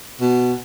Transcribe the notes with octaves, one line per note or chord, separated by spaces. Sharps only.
B2